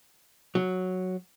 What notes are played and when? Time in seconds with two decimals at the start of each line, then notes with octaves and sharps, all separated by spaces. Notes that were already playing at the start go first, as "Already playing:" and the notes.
0.55 F#3